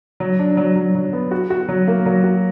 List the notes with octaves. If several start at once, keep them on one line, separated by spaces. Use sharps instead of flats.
F#3
D4
F#3
F#3
F#3
B3
F#4
F#4
F#3
A#3
F#3
F#4